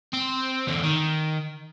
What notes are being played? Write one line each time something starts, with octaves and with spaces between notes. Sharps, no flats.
C4
E2 D3
D#3